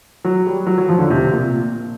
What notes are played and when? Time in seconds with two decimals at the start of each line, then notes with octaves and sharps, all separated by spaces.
0.25 F#3
0.46 G3
0.67 F#3
0.78 F#3
0.89 F3
0.99 D3
1.10 C3
1.32 A#2